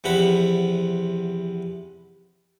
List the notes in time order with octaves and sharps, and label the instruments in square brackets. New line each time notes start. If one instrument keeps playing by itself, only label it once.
[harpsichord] E2 C3 F3 F#5 B5